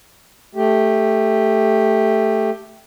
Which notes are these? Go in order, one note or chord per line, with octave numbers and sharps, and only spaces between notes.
A3 G4